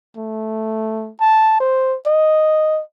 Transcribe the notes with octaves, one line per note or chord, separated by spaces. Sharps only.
A3
A5
C5
D#5